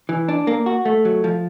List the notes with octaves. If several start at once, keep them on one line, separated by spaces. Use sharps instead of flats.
E3
D4
A#3
F#4
A3
F#3
F3